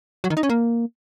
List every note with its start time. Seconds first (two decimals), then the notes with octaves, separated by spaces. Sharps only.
0.24 F#3
0.30 D#3
0.37 D#4
0.43 C#4
0.50 A#3